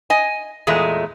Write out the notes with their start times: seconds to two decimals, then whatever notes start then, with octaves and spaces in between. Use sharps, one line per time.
0.10 D#5 G#5
0.67 E2 A#2 G#3 A3